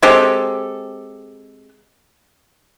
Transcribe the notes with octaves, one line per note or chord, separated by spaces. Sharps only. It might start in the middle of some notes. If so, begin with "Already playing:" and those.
G#3 C4 G4 A4